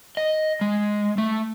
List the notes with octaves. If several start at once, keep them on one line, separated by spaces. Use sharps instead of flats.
D#5
G#3
A3